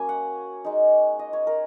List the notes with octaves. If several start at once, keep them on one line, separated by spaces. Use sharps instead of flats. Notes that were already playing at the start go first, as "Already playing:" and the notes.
Already playing: F#3 A#3 C#4 G#5
F#5
G#3 D#4
D#5
C#5
A#4